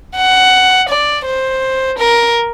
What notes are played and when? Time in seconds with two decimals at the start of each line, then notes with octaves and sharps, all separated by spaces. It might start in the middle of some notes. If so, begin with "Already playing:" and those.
0.16 F#5
0.89 D5
1.26 C5
1.98 A#4